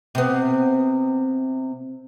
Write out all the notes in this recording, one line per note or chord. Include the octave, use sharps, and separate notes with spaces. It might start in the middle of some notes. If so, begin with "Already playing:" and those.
C3 B3